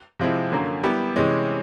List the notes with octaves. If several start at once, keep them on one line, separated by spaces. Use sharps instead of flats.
C3 F3 G#3 C4 E4
F#2 D3 F#3 A#3
G3 B3 E4 G4
C3 E3 G#3 C#4